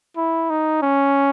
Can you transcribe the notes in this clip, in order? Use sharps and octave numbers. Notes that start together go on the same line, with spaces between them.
E4
D#4
C#4